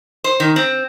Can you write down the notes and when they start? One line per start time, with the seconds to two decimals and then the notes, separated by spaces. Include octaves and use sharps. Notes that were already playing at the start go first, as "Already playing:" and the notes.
0.24 C5
0.40 D#3
0.56 C4